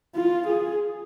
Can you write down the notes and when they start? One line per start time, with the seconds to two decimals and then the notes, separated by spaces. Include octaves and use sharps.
0.15 F4
0.47 G#4